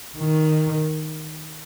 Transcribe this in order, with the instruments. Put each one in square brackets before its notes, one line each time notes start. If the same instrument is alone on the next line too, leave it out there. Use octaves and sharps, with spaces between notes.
[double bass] D#3